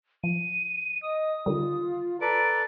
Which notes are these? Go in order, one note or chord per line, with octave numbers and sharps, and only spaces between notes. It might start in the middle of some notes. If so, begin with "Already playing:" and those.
F3 D#7
D#5 D#6
D3 D#3 G3 F4
A4 B4 D5 A#5 D7